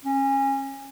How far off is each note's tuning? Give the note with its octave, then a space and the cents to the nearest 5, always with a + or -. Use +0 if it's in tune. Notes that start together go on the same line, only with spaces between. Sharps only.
C#4 -25